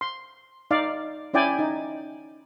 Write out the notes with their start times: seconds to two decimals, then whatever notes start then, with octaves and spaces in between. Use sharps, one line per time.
0.01 C6
0.71 D#4 D5 F5
1.34 C#4 E4 D5 G5 G#5
1.59 D#4